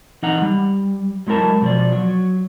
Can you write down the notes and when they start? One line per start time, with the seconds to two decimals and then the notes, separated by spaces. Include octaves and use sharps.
0.23 E3 D#4 F#5 A#5
0.42 G3
1.27 F#3 G#3 E4 A#4 A5
1.62 B2 F3 D5
1.92 F#3